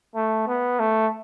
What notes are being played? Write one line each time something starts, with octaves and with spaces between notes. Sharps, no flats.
A3
B3
A3